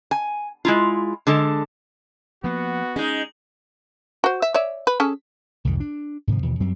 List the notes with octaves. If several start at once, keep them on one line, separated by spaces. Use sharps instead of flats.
G#5
G#3 E4 F4
D3 G#3 A4
F3 A#3 B3 F#4
G#3 C#4 D#4
F#4 C5
E5
C#5 D5 E5
B4
C#4 G#4 A4
C2 F2 G#2 D#3
D4
G#2 C3 D#3 F3
D#2 B2 E3
F#2 F#3 G3 C4